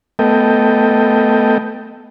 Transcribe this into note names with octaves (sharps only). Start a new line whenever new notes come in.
A3 B3 A4 D#5 G5